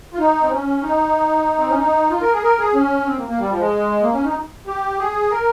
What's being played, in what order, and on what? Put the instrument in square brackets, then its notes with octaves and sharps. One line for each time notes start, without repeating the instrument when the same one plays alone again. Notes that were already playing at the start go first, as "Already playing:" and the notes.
[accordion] F4
D#4
C4
C#4
D#4
C4
C#4
D#4
F4
A#4
G#4
A#4
G#4
C#4
C4
A#3
A#3
G3
F3
G#3
A#3
C#4
D#4
G4
G#4
A#4